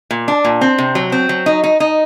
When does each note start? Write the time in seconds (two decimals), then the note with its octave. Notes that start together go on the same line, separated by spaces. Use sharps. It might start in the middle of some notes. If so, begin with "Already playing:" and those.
0.11 A#2
0.28 D4
0.44 A#2
0.61 C4
0.78 C3
0.95 F#3
1.12 C4
1.29 F#3
1.46 D#4
1.64 D#4
1.80 D#4